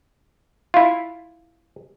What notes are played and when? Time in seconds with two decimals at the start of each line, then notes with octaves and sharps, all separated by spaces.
0.74 E4 F4